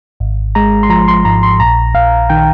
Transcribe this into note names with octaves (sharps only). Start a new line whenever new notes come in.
G#1
G#3 A#5
C6
F3 A#5
C6
G#2 A#5
C6
A#1 A#5
A#1 F5
D#3 G5